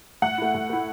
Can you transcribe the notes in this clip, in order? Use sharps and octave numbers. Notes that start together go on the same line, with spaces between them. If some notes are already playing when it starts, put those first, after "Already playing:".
A2 F#5
A3 E4
A2
A3 E4